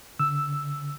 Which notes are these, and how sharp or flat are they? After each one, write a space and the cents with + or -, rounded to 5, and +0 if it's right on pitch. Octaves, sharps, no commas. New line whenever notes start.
D3 -35 E6 +0